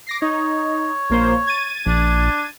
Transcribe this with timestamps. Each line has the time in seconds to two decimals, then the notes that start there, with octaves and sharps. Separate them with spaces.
0.07 D6 A#6 C7
0.22 D#4 C#5
1.10 A#1 A#3 C5
1.47 G#6 A6 D#7
1.86 A#1 D4